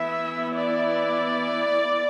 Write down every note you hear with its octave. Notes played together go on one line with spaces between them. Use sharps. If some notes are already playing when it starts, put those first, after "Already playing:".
Already playing: E3 B3 E4 E5
D5